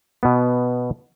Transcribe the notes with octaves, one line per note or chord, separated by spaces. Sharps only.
B2 B3